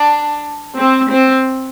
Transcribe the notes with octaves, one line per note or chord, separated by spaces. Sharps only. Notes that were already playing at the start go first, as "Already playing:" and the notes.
Already playing: D4
C4
C4